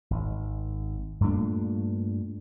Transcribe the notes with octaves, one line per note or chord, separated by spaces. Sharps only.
G#1
G2 A#2 A3 D4